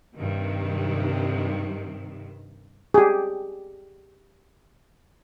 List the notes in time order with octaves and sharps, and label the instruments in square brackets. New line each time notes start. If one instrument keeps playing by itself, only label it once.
[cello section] G2 C3 D#3
[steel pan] G4 G#4